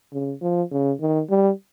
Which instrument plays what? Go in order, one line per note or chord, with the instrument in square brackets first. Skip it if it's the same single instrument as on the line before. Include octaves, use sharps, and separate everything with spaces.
[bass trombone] C#3
F3
C#3
D#3
G3